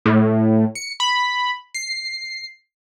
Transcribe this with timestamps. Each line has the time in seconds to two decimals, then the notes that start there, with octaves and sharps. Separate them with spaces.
0.06 A2
0.75 C#7
1.00 B5
1.74 C7